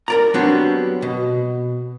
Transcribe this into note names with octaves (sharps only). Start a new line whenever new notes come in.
A#4 D5 A#5
F#3 G3 B3 C4 D4 F#4
B2